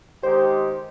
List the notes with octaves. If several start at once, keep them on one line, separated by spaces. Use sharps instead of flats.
D#3 G#3 G4 C5